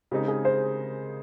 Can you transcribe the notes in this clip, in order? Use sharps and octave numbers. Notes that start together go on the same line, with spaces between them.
C#3 G#3 C4 D#4 G4 A#4
G#4
C5